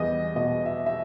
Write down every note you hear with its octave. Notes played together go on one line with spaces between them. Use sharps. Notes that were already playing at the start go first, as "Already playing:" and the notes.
Already playing: E2 G3 D#5
B2 D#5
E5
E5